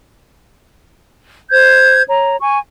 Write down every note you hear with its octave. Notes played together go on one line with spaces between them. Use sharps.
C5 G6 G#6
C#5 A#5
G#5 C#6